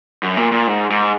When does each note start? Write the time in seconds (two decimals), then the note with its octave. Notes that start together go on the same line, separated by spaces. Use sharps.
0.23 F#2
0.37 A#2
0.52 A#2
0.67 G#2
0.90 G#2